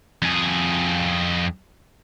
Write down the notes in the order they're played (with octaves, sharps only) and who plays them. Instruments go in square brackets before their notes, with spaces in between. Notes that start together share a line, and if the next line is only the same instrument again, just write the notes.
[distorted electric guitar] F2 G#4